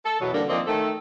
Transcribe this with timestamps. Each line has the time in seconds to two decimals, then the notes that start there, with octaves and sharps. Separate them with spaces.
0.05 A4
0.21 E2 B2 F#3
0.34 D3 E3 G3 A#3 D4
0.49 D#3 F3 A#3 C4 D5 D#5
0.67 D#3 A3 A4